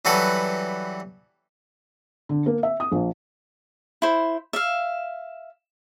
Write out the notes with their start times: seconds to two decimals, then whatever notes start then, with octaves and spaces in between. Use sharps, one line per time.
0.05 E3 F#3 G3 F#4 A4 B4
2.29 D3
2.46 A#3
2.63 E5
2.80 D#6
2.92 A#1
4.02 E4 C5
4.53 E5 F5